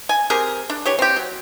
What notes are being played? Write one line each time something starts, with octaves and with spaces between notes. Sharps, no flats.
G#5
C4 G4 G#4 A#4
D4
E3 G4 C#5
C4 G4
F#3